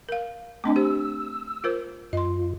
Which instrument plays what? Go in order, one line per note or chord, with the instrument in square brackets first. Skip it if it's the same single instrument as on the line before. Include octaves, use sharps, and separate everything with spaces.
[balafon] A#4 F5
[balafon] A3 C4 D4 [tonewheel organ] D#5 G#5 D6
[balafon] G4 C5 [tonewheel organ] E6
[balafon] F4 A#4 C5
[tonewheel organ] F#2 F4 [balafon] D#5 C6